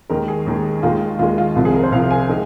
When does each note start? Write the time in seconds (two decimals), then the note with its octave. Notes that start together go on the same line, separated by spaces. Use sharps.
0.10 D#2 D#3 G#3 A#4
0.28 G#4
0.47 D#2 D#3 G#3
0.83 D#2 D#3 G#3 F4
1.19 D#2 D#3 G#3 F4
1.38 F4
1.55 C2 C3 F3 F4
1.65 G#4
1.74 A#4
1.83 C5
1.92 C2 C3 F3 F5
2.11 G#5
2.29 D#3 G#3